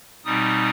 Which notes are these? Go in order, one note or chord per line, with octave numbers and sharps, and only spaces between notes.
B2 G3 C4 D#4 D#6